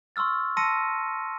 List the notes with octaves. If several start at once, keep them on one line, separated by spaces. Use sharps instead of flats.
C6 C#6 E6 F6 A6
A5 C6 E6 A#6 C#7 D#7